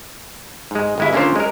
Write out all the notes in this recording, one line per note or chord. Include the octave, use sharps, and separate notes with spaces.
G#2 G#3
G1 G#3 E4
D3 A#3 C#4 F4 A#4 C5
G#3 A#4